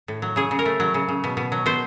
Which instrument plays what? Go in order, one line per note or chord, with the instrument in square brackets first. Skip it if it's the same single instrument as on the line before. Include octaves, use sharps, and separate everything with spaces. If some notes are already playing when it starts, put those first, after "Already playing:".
[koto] A2
F#3
C#3 G#4
C#3
A#4
A3
F#3
C#3
C#3
B2
B2
F#3
B2 C5